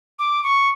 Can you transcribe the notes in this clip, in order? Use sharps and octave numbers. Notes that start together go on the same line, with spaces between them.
D6
C#6